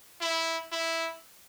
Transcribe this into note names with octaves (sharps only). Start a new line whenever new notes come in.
E4
E4